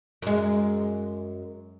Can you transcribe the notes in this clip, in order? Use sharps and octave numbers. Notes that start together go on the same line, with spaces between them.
F#2 G#3